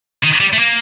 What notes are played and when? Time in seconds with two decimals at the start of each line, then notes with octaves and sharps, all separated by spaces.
0.24 D#3
0.41 G3
0.53 A3
0.59 A#3